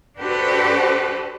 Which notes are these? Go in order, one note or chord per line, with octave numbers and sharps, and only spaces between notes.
D4 F#4 G4 A4 B4 C5